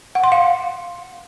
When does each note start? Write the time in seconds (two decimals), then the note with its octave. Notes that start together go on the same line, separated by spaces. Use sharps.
0.15 F#5
0.24 C6
0.32 F5